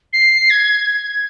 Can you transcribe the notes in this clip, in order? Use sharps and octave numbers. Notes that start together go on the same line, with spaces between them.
C7
G#6
G#6